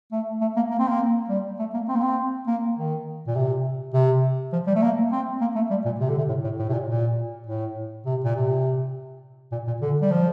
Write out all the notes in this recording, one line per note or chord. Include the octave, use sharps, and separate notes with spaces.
A3
A3
A#3
A#3
C4
A#3
G3
A3
A#3
C4
A#3
C4
A#3
D#3
A#2
C3
C3
F3
G3
A3
A#3
C4
A#3
A3
G3
A#2
C3
D3
C3
A2
A2
A2
C3
A#2
A#2
A2
C3
A#2
C3
A#2
A#2
D3
G3
F3